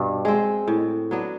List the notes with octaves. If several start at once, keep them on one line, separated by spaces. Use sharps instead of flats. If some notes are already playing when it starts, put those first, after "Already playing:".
Already playing: G2 B2
G#3 C4
A2
F#3 B3 D4